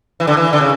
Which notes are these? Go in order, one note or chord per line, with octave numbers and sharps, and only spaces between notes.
E3
D3
E3
D3
C#3